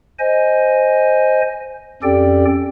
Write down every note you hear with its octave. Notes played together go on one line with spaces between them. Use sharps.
C5 D#5 G#5
F2 C#4 G4 A4 D5 G5